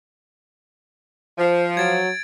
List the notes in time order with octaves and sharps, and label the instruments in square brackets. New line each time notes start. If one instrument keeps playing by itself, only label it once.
[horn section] F3 [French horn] C5
[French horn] F#3 [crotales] G#6 A6 D7